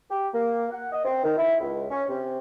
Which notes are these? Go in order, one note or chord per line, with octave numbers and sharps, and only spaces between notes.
G4
A#3
F#5
D#5
C4
D#3
E4
C#2
C#4
C3